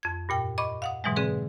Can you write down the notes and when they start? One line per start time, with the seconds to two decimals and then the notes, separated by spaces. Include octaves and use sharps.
0.03 F2 G#6
0.29 G2 A#2 G5
0.58 D#5 B5 C#6 D6
0.82 F5 F#5 D#6
1.04 G#2 B2 E3 F#3 G#3
1.16 D3 C4 G#4 B4